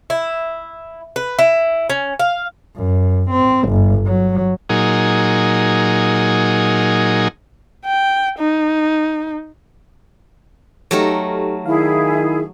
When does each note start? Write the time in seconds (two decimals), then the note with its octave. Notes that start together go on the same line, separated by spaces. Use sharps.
0.10 E4
1.16 B4
1.39 E4
1.90 C#4
2.19 F5
2.76 F#2
3.31 C4
3.69 G1
4.06 F#3
4.69 A#2 F#3 D#4 G#4
7.85 G5
8.39 D#4
10.91 F#3 A3 D#4 G4 A4 A#4
11.66 D#3 E4 G#4 F5